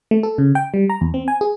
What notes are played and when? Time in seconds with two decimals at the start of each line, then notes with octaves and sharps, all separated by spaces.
0.11 A3
0.23 A4
0.38 C#3
0.55 G5
0.74 G3
0.90 A#5
1.01 E2
1.14 C4
1.28 G#5
1.41 G#4